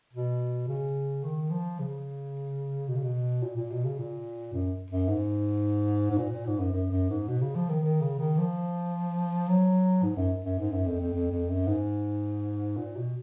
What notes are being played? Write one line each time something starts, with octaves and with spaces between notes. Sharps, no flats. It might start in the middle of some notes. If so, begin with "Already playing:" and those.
B2
C#3
D#3
F3
C#3
B2
C#3
B2
A#2
A#2
B2
C#3
A#2
F#2
F#2
G#2
G#2
A#2
A#2
G#2
F#2
F#2
F#2
G#2
B2
C#3
F3
D#3
D#3
C#3
D#3
F3
F#3
G#2
F#2
F#2
G#2
F#2
F2
F2
F2
F2
F#2
G#2
A#2
B2